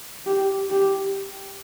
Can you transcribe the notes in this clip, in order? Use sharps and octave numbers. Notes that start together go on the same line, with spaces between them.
G4
G4